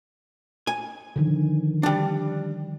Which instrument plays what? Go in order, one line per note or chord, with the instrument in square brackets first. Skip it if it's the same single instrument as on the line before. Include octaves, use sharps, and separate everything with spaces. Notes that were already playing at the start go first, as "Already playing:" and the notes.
[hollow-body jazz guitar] G#5
[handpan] D3 D#3 F3
[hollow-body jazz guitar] G3 D4